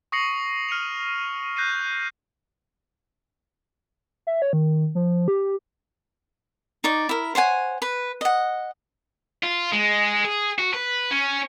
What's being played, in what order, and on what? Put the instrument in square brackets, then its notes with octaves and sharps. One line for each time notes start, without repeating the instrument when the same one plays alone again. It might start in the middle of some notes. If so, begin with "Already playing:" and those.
[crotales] C#6 D#6 A#6 C7 C#7 F#7
F6 C#7 D#7 F7
F#6 G6 A#6 C7 D#7
[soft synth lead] E5
C#5
D#3
F3
G4
[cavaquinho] D#4 D5 C#6
E4 A#4
C5 C#5 F#5 G#5
B4
D#5 F#5
[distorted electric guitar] F4
G#3
G#4
F#4
B4
C#4